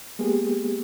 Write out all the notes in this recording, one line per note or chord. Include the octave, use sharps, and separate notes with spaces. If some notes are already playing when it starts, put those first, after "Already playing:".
G#3 A#3 B3 G4 G#4